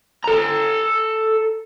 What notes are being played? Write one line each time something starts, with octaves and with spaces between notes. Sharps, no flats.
A4 A#5